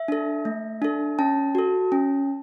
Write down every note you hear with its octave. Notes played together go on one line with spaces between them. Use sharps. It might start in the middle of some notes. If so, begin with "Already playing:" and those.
Already playing: E5
D4 A4
A3
D4 A4
C#4 A5
F#4 A4
C#4